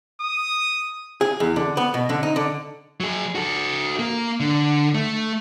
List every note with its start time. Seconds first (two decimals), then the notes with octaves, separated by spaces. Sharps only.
0.22 D#6
1.21 G#4
1.40 E2
1.56 D3
1.77 B3
1.94 B2
2.10 D3
2.23 D#4
2.36 D3
3.00 F#3 G#4
3.35 F#4 A4
3.99 A#3
4.40 D3
4.95 A3